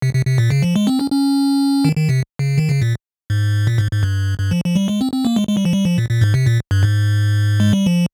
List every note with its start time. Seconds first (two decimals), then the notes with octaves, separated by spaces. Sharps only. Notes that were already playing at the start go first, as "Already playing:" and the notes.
0.02 C3
0.15 C3
0.26 C3
0.38 A#2
0.50 C#3
0.63 F3
0.76 G#3
0.87 C4
0.99 C#4
1.12 C#4
1.85 D#3
1.97 D#3
2.09 C3
2.39 C#3
2.58 D#3
2.69 C#3
2.82 A#2
3.30 G#2
3.67 A#2
3.78 G#2
3.91 G#2
4.03 G2
4.39 G2
4.51 F3
4.64 F3
4.76 G3
4.88 G#3
5.01 C4
5.13 C4
5.25 A#3
5.36 G#3
5.48 G#3
5.57 G3
5.65 F3
5.73 G3
5.85 F3
5.98 A#2
6.10 A#2
6.21 G#2
6.34 C3
6.46 A#2
6.71 G2
6.83 G#2
7.60 G#3
7.73 G3
7.86 F3